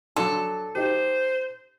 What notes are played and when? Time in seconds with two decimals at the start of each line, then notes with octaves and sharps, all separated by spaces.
0.16 F#3 D4 A4 C6
0.75 D#4 G4 C5